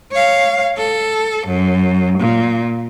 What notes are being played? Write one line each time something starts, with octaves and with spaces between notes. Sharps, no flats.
C#5 F5
A4
F#2
A#2